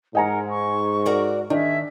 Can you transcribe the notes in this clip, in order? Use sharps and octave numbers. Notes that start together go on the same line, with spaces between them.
G#2 A#4 D#5 F#5 G#5 A#5
C#6
F#4 A#4 D5
D#3 D4 G#4 E5